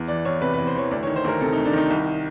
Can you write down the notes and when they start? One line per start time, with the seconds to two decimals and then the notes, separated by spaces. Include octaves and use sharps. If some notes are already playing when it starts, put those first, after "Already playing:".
Already playing: E2
0.08 E3 D5
0.25 E2 C#5
0.42 C3 B4
0.54 B4
0.58 E2
0.67 C5
0.75 E3 C#5
0.91 D2 D5
1.03 C#5
1.07 D#3
1.16 C5
1.24 D2 A#4
1.41 C3 A4
1.53 D#4
1.58 D2
1.65 D4
1.73 D#3 D#4
1.90 C2